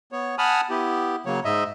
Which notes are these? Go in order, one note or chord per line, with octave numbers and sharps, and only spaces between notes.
B3 C#5
F#5 G#5 A5 B5 D#6 F6
B3 E4 G4
C#3 F#3 A#3 C#5
G#2 D#5 E5